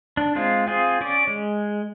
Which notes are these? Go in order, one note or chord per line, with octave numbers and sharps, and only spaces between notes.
D4
G#3 C4 F4
C4 F4 G#4
C#4 D5
G#3